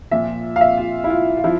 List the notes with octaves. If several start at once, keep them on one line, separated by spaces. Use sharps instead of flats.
A#2 F3 E5
F5
E5
F4
E4
F4
F4
F3 E4